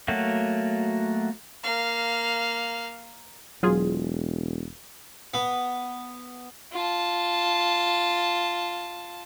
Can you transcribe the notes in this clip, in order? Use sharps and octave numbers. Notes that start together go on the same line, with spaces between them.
F#3 A3 A#3 F#4
A#3 F5
E1 F#3 F4 G#4
B3
F4 A5